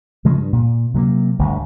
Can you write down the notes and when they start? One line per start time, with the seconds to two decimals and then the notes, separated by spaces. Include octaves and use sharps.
0.25 C#3 F3 G#3 A3
0.37 G2
0.53 A#2
0.94 C3 F#3 G#3 A#3
1.39 G1 D2 G2